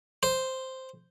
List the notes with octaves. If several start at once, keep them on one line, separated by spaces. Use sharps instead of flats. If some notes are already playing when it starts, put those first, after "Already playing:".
C5